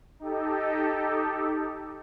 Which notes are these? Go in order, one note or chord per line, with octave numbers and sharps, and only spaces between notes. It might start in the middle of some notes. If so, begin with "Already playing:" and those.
D#4 G4 A4